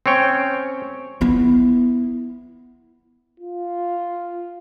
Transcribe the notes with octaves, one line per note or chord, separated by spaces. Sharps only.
C4 C#4 C#5 G5
B3 E4
F4